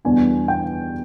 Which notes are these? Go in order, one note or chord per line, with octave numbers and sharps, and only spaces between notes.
E2 B2 G3 B3 D4 G#5
G5